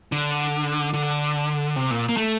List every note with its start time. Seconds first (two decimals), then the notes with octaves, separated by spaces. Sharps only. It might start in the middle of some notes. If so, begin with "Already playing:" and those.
0.12 D3
0.93 D3
1.76 C3
1.91 A#2
2.09 A#3
2.17 A3